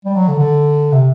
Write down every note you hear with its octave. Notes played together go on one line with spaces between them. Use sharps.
G3
F#3
D3
D3
C3